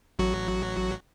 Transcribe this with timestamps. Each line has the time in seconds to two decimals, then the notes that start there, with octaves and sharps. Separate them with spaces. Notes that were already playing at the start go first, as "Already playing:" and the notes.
0.19 A1 F#3 F#4